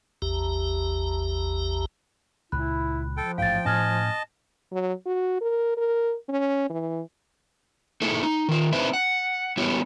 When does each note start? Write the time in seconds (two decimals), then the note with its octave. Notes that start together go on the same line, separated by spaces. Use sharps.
0.22 A1 E2 G4 A#5
2.52 C#2 A#2 E4 B5 F#6
3.17 F3 A4 G5
3.38 A1 G#2 F5 G5 A6
3.65 A2 C#4 D#5 G#5 A5 F6 G#6
4.72 F#3
5.06 F#4
5.41 A#4
5.77 A#4
6.29 C#4
6.70 E3
8.02 A#3 D#4 E4 G#4 A4
8.23 D#4
8.49 D#3 F4
8.73 C4 D#4 E4 B4 C5 E5
8.93 F#5
9.57 G3 B3 E4 F#4 G4 C#5